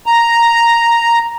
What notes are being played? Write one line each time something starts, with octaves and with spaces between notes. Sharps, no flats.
A#5